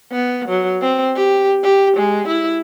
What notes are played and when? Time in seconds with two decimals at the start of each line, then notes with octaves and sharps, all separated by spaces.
0.12 B3
0.48 F#3
0.81 C4
1.16 G4
1.63 G4
1.97 G#3
2.28 E4